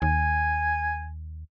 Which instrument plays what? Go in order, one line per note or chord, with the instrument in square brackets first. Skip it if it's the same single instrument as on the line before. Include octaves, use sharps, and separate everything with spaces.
[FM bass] D#2 [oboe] G#5